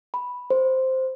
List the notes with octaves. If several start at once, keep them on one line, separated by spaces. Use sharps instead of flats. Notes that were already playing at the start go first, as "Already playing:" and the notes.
B5
C5